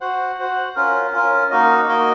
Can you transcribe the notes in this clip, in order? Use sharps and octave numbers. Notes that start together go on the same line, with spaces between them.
F#4 C5 F#5
F#4 C5 F#5
C#4 F4 A#4
C#4 F4 A#4
A#3 D#4 F#4 A#4 D#5
A#3 D#4 F#4 A#4 D#5